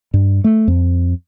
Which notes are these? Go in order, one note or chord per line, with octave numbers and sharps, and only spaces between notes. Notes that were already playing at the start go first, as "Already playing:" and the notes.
G2
A3
F2